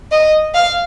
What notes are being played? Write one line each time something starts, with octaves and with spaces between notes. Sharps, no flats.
D#5
F5